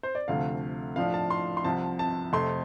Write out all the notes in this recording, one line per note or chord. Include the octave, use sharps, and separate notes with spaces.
C5
D5
D2 C3 F3 A3 F5
A2 F3 D4 F5
A5
C6
C6
C2 C3 F3 A5
A5
F2 C3 A3 C6